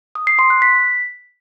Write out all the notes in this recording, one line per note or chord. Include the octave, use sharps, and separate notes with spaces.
D#6
C7
C6
F#6
B6